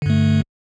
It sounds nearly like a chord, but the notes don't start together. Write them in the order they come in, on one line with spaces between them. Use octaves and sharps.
D3 G2 A3